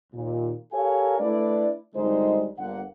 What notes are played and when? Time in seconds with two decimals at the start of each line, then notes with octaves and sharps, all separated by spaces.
0.13 D#2 A#2
0.72 G4 A4 A#4 C#5 F5 G#5
1.19 A3 D4 E4 B4 D5
1.95 G#1 D3 G3 G#3 D#4 C5
2.58 G1 D3 A#3 F#5